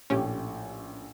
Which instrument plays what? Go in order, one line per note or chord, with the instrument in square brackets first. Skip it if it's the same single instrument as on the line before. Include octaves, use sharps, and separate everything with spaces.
[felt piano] A#1 A2 [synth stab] C#4 G4